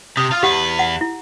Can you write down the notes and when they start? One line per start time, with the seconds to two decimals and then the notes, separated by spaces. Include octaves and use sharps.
0.17 C3 G4 D#6
0.31 F4 F5
0.43 E2 G4 B4 F#5
0.79 F#5
1.01 E4